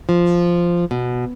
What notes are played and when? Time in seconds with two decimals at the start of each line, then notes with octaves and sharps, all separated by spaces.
0.09 F3
0.91 B2